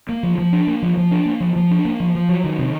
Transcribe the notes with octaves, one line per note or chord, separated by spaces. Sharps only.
A#3
F3
F3
D4
A#3
F3
F3
D4
A#3
F3
F3
D4
A#3
F3
F3
F#3
D#3
C3